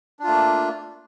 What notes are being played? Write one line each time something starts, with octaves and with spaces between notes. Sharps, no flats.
A3 A#3 D4 F4